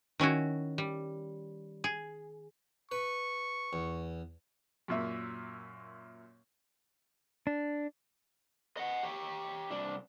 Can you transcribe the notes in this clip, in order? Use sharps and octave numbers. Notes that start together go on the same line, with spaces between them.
D#3 C#4 E4 F#4
G3
G#4
B4 C#6
E2
F#2 A#2 E5
D4
D#5 F#5
G4 C#5
C2 D4